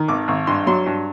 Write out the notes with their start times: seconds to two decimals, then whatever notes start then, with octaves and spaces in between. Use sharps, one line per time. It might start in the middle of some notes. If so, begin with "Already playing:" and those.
Already playing: D#3
0.08 G#1 D6
0.28 G#1
0.47 G2 C6
0.66 F#3 C6
0.86 G2